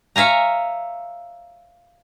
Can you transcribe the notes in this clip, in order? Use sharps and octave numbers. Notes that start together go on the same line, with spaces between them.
C#5 E5 F5 G#5 A#5